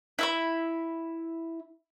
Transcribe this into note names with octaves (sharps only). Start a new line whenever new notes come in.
E4 E5 B5